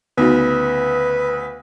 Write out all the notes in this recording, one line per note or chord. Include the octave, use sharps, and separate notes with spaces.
D2 C#3 B3 D#4 F#4 B4